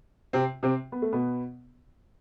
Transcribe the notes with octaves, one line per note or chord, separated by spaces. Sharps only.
C3 C4
C3 C4
B3
A3
B2 B3